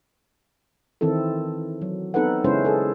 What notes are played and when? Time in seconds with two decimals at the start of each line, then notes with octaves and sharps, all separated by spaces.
1.01 D#3 E3 C4 E4 A4
1.82 F#3
2.14 B3 C4 D#4 A4 B4 F#5
2.44 C#3 G#3 C#4 E4 B4 C5
2.65 G#4 A4